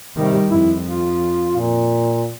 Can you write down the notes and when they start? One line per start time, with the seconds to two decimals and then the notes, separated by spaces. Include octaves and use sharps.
0.16 C3 D#3 G3
0.50 F2 E4
0.84 F4
1.57 A#2